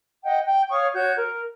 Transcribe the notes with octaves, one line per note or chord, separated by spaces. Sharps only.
D#5 F#5 G5
G5
C#5 F5 C#6 D#6
F#4 C#5 G6
A#4